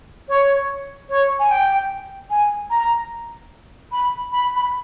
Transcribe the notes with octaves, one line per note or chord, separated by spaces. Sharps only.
C#5
C#5
G#5
G5
G#5
A#5
B5
B5
B5